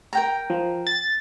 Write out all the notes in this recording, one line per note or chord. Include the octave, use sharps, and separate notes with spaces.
A#4 G5 A#5
F3
A6